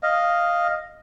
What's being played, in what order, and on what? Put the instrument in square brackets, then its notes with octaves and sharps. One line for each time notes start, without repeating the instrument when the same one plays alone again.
[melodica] D#5 F5